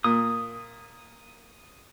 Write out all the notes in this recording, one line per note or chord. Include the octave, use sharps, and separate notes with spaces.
A#2 D#6